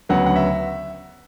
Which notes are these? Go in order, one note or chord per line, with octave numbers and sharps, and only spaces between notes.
D2 C#3 F#3 B3 F#5
F#5
E5